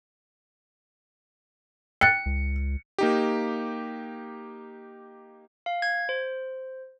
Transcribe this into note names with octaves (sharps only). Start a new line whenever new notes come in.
G5 F#6 A6 C#7
C#2
A#3 D#4 G4
F5
G#6
C5